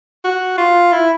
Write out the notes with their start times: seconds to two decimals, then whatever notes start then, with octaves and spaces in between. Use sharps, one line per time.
0.24 F#4
0.58 F4
0.93 E4